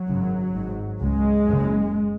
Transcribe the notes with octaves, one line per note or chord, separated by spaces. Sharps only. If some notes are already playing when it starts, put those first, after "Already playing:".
Already playing: F#3
G#1 F#2 C#3
G#1 G#2
C#2 C#3 G#3
F#1 F#2 C#3